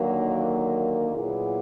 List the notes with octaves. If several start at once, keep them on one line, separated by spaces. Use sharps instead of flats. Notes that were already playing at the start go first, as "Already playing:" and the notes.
Already playing: D#2 D3 F#3 A#3
A#2 F#3 B3 E4 G#4